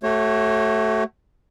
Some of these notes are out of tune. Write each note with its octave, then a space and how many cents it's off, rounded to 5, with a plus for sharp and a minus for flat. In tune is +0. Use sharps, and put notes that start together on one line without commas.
A3 +0 F#4 +35 C#5 -30